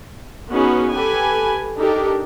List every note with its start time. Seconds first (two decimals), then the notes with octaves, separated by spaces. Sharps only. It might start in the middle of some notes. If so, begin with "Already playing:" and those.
0.51 B3 C#4 D#4 F#4 G#4 B4
0.92 G4 A4 B4 G#5
1.76 D4 D#4 G4 A4 A#4